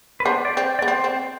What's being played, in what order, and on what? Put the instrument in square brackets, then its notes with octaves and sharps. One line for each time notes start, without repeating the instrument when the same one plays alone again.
[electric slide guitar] B4
[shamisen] B3 D4 [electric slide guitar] C5
[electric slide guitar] D5
[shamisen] C4 [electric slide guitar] C5
[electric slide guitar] D5
[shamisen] B3
[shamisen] C4 [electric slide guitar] C5
[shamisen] C4